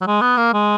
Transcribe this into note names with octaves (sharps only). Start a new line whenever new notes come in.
F#3
G#3
B3
A#3
G#3